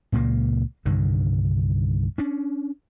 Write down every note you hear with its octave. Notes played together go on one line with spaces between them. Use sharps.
C#2 A#2 F#3 A#3
C2 G2 D3 D#3
C#4 D4